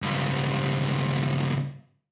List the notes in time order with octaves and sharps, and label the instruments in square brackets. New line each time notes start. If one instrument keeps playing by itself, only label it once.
[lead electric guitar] C#2 G2